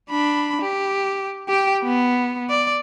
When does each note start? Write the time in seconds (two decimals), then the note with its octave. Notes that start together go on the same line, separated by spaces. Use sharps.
0.11 D4 B5
0.62 G4
1.48 G4 G5
1.84 B3
2.50 D5